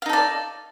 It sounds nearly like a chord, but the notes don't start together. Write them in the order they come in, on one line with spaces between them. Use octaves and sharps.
F5 D#4 A4 D5